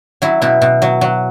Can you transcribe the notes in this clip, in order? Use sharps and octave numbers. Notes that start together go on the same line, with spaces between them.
F#3 E4
B2 E4
B2
F#3
F#3